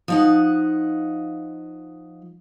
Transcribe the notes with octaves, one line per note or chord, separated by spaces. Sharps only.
F3 D#4 F#5